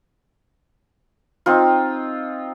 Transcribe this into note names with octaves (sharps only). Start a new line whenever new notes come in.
C4 D#4 F4